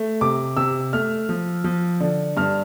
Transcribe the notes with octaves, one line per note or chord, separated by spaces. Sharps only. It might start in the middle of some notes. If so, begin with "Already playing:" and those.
Already playing: A3
C3 D6
C3 E6
A3 F6
F3
F3
D3
G2 F6